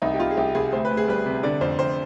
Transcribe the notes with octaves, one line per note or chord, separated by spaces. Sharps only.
C2 D#4
G4
C2 F4
G#4
C2 G4
C2 G#4
D2 C5
B4
D2
G#4
G3 B4
C3
D3 D5
F2 C5
F2 C5